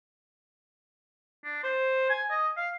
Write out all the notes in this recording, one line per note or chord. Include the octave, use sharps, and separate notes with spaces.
D4
C5
G#5
D#5
F5